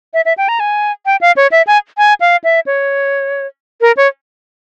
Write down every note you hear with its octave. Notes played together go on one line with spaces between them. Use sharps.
E5
E5
G5
A#5
G#5
G5
F5
C#5
E5
G#5
G#5
F5
E5
C#5
A#4
C#5